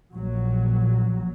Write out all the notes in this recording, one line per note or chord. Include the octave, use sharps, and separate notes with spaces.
A#1 A#2 F#3